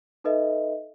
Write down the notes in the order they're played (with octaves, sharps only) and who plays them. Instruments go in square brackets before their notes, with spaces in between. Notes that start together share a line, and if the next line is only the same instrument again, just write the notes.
[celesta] D#4 A4 B4 D#5 E5